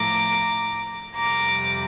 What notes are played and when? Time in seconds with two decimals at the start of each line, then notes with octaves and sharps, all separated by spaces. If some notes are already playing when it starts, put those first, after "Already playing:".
Already playing: A2 F3 A3 A#5 D6
1.16 F2 C3 G3 A#5 D6